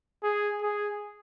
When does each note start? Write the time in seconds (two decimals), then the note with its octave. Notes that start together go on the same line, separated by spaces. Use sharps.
0.23 G#4
0.62 G#4